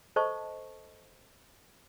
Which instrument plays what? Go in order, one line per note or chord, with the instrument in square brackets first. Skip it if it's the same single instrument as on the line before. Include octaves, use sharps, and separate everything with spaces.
[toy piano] A4 C5 D#5 A5 C#6